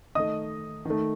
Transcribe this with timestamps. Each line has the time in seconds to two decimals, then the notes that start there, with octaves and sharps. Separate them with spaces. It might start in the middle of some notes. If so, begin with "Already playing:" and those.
0.15 D#3 A3 D#5 D#6
0.85 D#3 A3